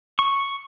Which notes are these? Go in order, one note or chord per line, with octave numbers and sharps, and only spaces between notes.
C#6